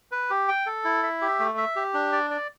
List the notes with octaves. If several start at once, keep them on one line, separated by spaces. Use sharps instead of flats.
B4
G4
G5
A4
E4
E5
G4
A3
E5
G4
D4
D5
D5